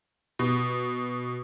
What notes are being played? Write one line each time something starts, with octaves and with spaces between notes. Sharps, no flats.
B2